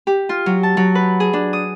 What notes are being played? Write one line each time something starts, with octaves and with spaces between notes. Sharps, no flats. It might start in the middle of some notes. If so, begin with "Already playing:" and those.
G4
F4
F#3
A5
F#3
B4
G#4
D4
D#6